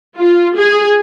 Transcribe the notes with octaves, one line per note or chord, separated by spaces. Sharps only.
F4
G#4